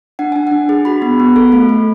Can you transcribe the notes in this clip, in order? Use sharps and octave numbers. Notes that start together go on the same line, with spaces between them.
D4 F#5
D4 G#5
D4 F#5
G#4
F#4 B5
B3
B3
A4
A3
A3